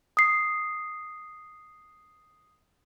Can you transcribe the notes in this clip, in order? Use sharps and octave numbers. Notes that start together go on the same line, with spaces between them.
D#6 C7